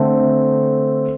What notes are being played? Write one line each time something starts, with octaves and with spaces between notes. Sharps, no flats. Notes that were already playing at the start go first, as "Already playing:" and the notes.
Already playing: D3 A3 C4